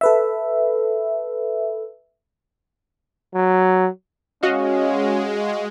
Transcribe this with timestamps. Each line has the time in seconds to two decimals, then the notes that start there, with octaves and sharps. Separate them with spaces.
0.01 A4 B4 E5
3.35 F#3
4.43 G#3 C#4 F#4 D#5 F5